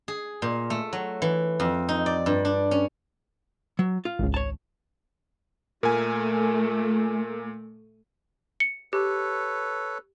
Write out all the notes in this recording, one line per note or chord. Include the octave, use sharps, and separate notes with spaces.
G#4
A#2
A3
F#3
E3
F2
D#4
D5
G2
D4
C#4
F#3
F4
G#1 C#2
C#5 A5
A#2 A3 A#4 G#5
C#7
G4 A4 B4 C#5